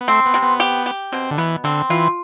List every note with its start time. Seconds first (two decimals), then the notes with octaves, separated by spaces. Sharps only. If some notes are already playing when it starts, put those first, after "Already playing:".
0.01 B3
0.08 A3 C4
0.26 B3
0.34 C3
0.42 B3
0.60 G4
0.86 G4
1.12 B2 C4
1.31 D3
1.38 E3 B3
1.64 D3 C4
1.90 E3 F4